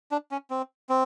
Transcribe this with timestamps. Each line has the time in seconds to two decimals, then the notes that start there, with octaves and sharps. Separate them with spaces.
0.11 D4
0.31 C#4
0.50 C4
0.89 C4